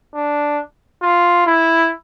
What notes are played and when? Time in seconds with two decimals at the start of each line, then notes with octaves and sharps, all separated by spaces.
0.15 D4
1.02 F4
1.46 E4